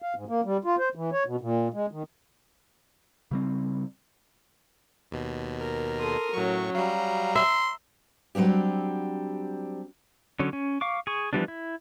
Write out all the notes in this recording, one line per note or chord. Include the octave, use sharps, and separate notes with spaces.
F5
G#2
A#3
G3
F4
C5
E3
C#5
B2
A#2
G#3
D#3
C#3 G3 C4
D#2 B2
A#4
A4 C6 D#6
A2 F#3 C#4 C#6
F#3 G3 F5 A#5
E5 C6
F#3 G3 C4 D4 G4
D3 F#3 C#4
C#4
F5 C#6 D6
G#4 C#6
E3 F3 G3 B3 D4
E4